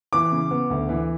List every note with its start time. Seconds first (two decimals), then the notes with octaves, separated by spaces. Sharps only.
0.13 E3 D6
0.32 C#3
0.51 B3
0.70 D2
0.89 E3